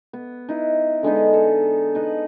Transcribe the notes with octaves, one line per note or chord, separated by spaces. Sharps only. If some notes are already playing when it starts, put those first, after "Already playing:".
B3
D#4 E4 B4
D3 G#3 B3 D#4
A4
D#4 B4